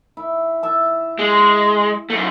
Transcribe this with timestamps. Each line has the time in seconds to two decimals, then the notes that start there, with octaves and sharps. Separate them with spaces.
0.17 E4
0.63 E5 A5
1.19 G#3
2.10 F#2 A3